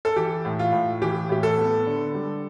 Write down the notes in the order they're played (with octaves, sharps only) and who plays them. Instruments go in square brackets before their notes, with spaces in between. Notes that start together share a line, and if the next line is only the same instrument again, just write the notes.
[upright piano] A4
E3 G4
A2
F4
A2
E3 G4
A2 G4
A4
B3
D3
G3